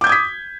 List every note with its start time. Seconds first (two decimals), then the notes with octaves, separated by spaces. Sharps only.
0.01 D6
0.04 G6
0.07 G#6
0.09 D#6
0.12 B6